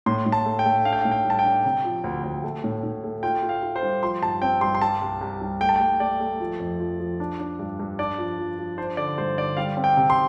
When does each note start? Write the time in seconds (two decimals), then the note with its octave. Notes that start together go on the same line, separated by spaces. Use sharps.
0.06 A2 C6
0.26 A2
0.32 A5
0.46 A3
0.59 G5
0.66 A3
0.85 D4 F5
0.93 G5
1.01 F5
1.05 A2
1.11 G5
1.25 G3
1.30 A5
1.39 G5
1.45 D4
1.65 C3
1.85 F3
2.04 D2
2.24 D2
2.44 A3
2.64 A2
2.83 A2
3.04 A3
3.23 F4 G5
3.43 F4
3.49 F5
3.63 F4
3.76 C5
3.83 G3
4.03 F3 C6
4.22 G2 A5
4.42 C4 G5
4.61 G2 C6
4.75 C6
4.82 G3 A5
5.01 C2
5.21 C2
5.42 G3
5.61 A3 G5
5.69 A5
5.76 G5
5.80 A3
6.00 A3 D5
6.20 A3
6.40 F3
6.60 F2
6.80 F3
7.00 F3
7.20 D4
7.40 D4
7.59 G2
7.79 G2
7.99 D4 D5
8.18 F3
8.39 F3
8.59 F3
8.78 D4 C5
8.97 D3 D5
9.18 G2 C5
9.38 D3 D5
9.57 G3 F5
9.77 C4
9.84 G5
9.97 C3
10.10 C6